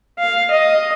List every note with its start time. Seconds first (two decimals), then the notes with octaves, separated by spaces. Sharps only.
0.19 F5
0.51 D#5